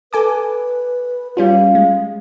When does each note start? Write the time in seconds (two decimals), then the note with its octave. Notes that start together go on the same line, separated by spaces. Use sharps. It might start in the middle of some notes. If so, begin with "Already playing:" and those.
0.13 A4 B4 G#5 D6
1.37 G3 C#4 F4 F5
1.75 G#3